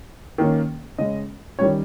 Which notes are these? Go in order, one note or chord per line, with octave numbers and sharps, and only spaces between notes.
D#3 A#3 C#4
C#3 G#3 C#4 D#5
D#3 G3 C#4 C#5